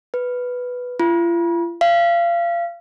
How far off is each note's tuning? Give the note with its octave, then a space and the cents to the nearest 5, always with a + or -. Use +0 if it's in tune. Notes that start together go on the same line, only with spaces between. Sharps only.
B4 +0
F4 -40
F5 -30